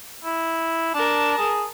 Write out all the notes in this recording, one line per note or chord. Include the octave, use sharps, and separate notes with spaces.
E4
D4 A#4 A5
G#4